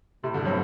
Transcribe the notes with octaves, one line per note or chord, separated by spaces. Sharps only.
A2 C3
G2 B2 D3
A2 C3 F#3